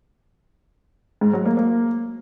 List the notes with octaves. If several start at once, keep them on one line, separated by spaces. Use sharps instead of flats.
G#2
F#3
A#3
A#3